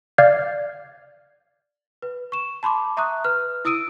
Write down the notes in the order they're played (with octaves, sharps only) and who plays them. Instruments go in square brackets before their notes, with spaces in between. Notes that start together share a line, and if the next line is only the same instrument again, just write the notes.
[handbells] D5 F5 F6 G6 G#6
[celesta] B4
C#6 E7
A5 B5 C6 D6
E5 A#5 C#6 D#6 F#6
B4 F6
E4 D#6 E6 D7 D#7